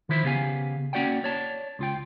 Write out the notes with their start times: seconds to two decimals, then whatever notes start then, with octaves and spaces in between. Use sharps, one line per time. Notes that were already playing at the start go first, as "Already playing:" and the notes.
0.09 D#3 F3 E4 C5
0.24 C#3 B3 G4 F5 G#5
0.93 A#3 C#4 F#4 D5 F#5 G5
1.24 C#5 D5 A5
1.79 C#2 F4 G5